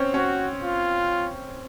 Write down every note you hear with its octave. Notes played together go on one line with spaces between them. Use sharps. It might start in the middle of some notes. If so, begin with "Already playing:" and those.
Already playing: C4 C#4
C#4 F#4
F4